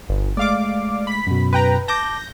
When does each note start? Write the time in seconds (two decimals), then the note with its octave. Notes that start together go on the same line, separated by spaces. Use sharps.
0.09 G1
0.37 G#3 A3 D5 F5 D6
1.07 B5 B6
1.27 F#2 B2
1.53 B4 G5 A#5
1.88 A5 D6 G6 A#6